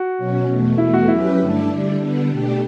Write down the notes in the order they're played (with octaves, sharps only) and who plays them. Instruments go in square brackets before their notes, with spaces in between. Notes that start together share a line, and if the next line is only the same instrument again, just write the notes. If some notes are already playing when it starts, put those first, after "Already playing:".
Already playing: [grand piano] F#4
[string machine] B2 F#3 C#4
E2 B2 A3
[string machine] E2 B2 A3 [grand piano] E4
[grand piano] F#4
[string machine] F#3 C#4 G4 B4 [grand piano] E4
[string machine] G2 D3 A3 D4 A4
D3 G3 D4
D3 G3 B3 D4
B2 A3 D4 G4